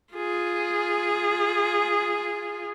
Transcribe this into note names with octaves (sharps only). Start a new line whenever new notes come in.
F4 G#4